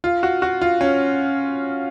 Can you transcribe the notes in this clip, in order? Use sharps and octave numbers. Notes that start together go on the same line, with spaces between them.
F4
F#4
F#4
F4
C#4